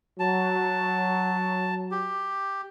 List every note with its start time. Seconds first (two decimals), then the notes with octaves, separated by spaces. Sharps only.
0.19 F#3 A5
1.91 G4